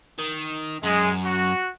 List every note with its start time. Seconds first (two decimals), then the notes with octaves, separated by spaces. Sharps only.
0.19 D#3
0.83 F#2 G#3
1.23 F#4